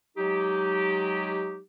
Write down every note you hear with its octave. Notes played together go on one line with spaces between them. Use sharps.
F#3 G#3 D#4 G4